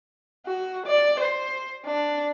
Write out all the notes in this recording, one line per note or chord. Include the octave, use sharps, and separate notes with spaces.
F#4
D5
C5
D4